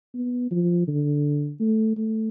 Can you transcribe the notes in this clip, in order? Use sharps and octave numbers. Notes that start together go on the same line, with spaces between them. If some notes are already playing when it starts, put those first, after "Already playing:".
B3
F3
D3
A3
A3